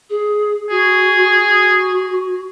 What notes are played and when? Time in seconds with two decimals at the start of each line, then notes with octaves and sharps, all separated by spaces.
0.10 G#4
0.70 F#4 G#4
1.36 F#4